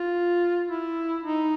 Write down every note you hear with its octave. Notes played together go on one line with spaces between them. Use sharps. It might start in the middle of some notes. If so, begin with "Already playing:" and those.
Already playing: F4
E4
D#4